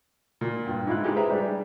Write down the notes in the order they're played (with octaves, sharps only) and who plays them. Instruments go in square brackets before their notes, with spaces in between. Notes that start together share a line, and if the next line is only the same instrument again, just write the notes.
[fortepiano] A#2
G2
G#2 E4 F4 F#6
G#3 D#4 F4 G4 G#4
G#4 B4 C5 E5 A#5
G3 D4 G#4